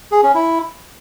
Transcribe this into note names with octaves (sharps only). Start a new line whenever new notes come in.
G#4
C#4
E4